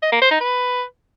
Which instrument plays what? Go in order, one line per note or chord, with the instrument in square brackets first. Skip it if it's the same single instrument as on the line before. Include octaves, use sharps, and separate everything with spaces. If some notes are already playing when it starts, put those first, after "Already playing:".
[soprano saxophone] D#5
A#3
C5
D#4
B4